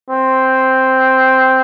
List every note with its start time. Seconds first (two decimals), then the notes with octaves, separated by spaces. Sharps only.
0.10 C4